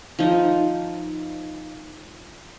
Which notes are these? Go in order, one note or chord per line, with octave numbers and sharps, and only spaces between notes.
F3 D#4